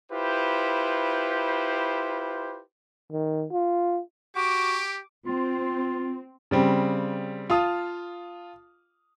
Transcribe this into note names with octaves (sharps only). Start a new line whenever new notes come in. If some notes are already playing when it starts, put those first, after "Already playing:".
E4 F4 G4 B4 C5
D#3
F4
F#4 G4 D6
C4 F4
C#3 G3 C4
F4 F5 A5 D#6